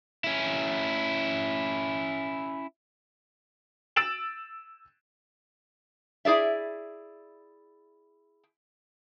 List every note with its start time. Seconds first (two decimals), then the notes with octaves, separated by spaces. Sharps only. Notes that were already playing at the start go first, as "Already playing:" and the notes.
0.24 C#4 E4
3.96 E6 A6 D7 E7 F#7
6.25 E4 G#4 D5 E5